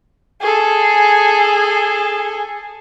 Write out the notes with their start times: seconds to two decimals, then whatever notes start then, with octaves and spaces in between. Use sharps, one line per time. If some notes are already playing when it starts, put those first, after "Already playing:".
0.41 G#4 A4